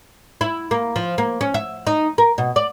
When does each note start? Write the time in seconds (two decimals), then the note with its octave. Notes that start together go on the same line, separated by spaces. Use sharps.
0.41 E4
0.71 A#3
0.96 F3
1.18 A#3
1.41 C#4
1.54 E5
1.87 D#4
2.18 A#4
2.38 B2
2.56 D5